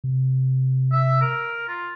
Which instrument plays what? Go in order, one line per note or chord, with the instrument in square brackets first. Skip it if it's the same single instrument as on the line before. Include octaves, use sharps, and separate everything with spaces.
[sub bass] C3
[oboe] E5
A#4
F4